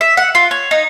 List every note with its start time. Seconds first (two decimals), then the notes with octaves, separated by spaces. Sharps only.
0.01 E5
0.17 F#5
0.35 F4
0.51 C#5
0.71 D#4